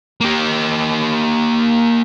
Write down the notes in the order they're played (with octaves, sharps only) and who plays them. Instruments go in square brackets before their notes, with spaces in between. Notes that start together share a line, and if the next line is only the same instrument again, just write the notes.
[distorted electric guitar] A#3 G4